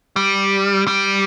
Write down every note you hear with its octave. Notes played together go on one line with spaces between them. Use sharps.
G3
G3